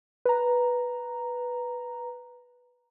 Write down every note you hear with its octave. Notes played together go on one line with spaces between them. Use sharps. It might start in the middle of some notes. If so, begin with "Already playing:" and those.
B4 A#5